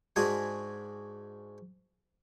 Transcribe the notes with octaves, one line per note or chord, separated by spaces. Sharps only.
G#2 D4 F#4 G#4 G#5 C6